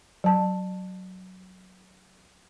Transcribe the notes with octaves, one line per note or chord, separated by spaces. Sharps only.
F#3 A5